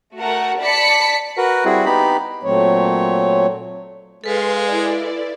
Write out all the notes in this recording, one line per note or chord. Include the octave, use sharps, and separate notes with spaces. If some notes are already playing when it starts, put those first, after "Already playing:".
A3 F#4 A#4 F#5
D5 A5 B5 B6 C#7
F#4 A#4 B4 F#5
G3 C4 E4 F#4 G#4
B3 D#4 G4 B5
A#2 F#3 A3 C4 C#5
G#3 A4 B4 F5 C6
E4 D5